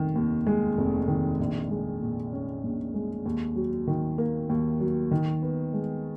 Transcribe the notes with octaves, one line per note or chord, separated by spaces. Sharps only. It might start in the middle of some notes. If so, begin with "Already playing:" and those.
Already playing: F1 D#3
D#2
G#3
F1
D#3
A#1
G#3
A#2
C#4
A#1
G#3
D#2
F#3
D#3
A#3
D#2
F#3
D#3
B3
G#3